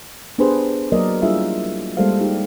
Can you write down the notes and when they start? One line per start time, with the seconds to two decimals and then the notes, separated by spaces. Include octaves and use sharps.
0.38 B3 D4 G4 G#4 B4 C5
0.92 F#3 A#3 A#4 D5 D#5
1.22 G3 D4 E4 F4 G#4 E5
1.97 G3 G#3 A#3 A4 C5 F5
2.21 D#4 G4